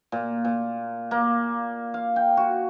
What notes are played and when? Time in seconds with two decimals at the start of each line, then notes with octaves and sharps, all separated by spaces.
0.12 A#2
0.44 A#2
1.11 A#3
1.94 F5
2.16 G5
2.37 F#4